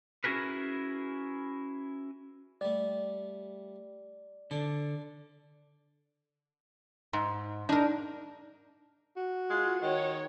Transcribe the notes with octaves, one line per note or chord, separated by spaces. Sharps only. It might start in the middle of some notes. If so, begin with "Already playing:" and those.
C#4 E4 F#4 G#4 A#4 B4
G3 A3 D5
D3 D4 C5 A5
G#2
D4 D#4 A#4
F#4
G#3 F4
D#3 C#5